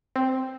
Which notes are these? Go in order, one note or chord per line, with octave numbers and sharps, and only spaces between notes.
C4